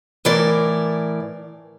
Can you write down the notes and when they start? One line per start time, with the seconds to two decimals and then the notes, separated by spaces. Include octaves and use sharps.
0.25 A2 E3 A#4 D5